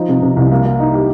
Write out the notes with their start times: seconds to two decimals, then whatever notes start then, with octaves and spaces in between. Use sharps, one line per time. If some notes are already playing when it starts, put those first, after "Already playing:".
Already playing: F3 D#4
0.09 C3
0.22 C3
0.36 C2
0.51 A#3
0.66 A#3
0.80 D#4
0.94 G4